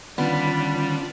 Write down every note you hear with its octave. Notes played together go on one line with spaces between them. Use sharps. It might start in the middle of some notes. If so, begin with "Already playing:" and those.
D3 D#3 G3 B3 C#4 D4 F4